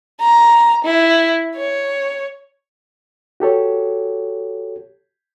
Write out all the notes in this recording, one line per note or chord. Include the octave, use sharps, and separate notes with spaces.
A#5
E4
C#5
F#4 G4 A4 C#5